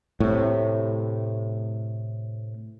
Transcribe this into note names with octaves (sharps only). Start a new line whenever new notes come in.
A2 C3